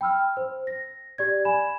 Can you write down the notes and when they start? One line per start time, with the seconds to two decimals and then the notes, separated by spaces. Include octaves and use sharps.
0.01 G5 B5 E6 F6
0.37 C5
0.67 A#6
1.18 G4 D5 G#6
1.45 G#5 B5 E7